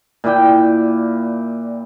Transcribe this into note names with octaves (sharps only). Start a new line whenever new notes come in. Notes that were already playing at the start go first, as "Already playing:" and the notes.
A#2 E4 D5 G5